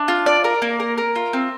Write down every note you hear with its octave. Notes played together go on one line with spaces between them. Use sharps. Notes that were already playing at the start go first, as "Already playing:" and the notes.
Already playing: D4
F4
D5
A#4
A#3
A#4
A#4
F4
C4